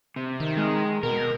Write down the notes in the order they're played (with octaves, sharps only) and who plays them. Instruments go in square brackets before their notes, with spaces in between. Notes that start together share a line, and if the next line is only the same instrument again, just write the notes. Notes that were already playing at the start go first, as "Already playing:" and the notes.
[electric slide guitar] C3
[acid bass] D#3
[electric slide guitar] G#3
[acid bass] B2 [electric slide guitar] A#4